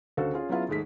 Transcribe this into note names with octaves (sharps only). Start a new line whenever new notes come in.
D2 C#3 F#4 A4 C5 F5
C#4 F4 G#4
F#3 B3 C#4 E4 F4 G#4
D#2 G#2 G#3 A3 B6